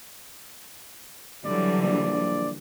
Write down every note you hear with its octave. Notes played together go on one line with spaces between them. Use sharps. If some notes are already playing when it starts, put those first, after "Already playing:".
D3 E3 F#3 G3 D5
A#1 D5